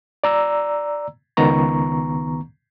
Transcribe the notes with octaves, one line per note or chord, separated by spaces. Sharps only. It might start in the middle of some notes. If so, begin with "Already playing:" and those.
D5 A#5 E6
C#2 D#3 B3 A#5 C#6